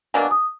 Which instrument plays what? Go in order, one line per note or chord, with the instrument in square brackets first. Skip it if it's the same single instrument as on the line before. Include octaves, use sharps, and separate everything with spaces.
[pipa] B2 F#3 A#3 D4 [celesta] G#5
[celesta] D#6